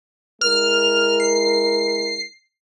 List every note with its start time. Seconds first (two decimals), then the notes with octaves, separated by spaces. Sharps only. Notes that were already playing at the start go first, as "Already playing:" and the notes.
0.41 G#3 E4 A#4 F6
1.20 C7